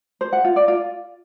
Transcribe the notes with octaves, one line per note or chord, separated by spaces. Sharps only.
C5
F#5
F4
D5
F4